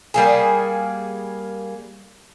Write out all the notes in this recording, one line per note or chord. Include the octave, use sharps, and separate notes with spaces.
G3 A#3 G#4